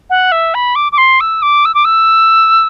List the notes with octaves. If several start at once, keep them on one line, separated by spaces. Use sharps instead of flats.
F#5
E5
B5
D6
D6
C6
E6
D6
E6
D6
E6